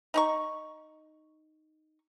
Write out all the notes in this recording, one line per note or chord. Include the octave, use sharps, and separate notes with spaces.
D#4 A#5 C#6